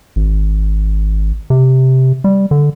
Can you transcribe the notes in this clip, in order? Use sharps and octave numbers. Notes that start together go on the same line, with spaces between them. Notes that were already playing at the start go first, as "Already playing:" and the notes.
G#1
C3
G3
D3